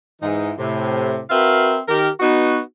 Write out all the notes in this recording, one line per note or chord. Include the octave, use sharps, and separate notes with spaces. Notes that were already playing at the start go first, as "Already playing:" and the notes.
G#2 E3 D#4
A2 C3
C4 F#4 A#4 B4 E5 F5
D#3 G4 A#4
B3 D#4 F#4